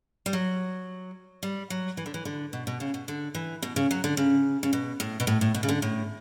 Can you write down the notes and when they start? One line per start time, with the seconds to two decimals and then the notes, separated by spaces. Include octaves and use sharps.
0.26 G3
0.33 F#3
1.43 G3
1.70 F#3
1.97 E3
2.06 D3
2.14 E3
2.25 D3
2.53 B2
2.67 B2
2.80 C#3
2.94 B2
3.08 D3
3.35 E3
3.62 B2
3.76 C#3
3.91 F#3
4.04 D3
4.17 C#3
4.63 C#3
4.73 B2
5.00 A2
5.20 B2
5.27 A2
5.41 A2
5.54 B2
5.63 C#3
5.69 D3
5.82 A2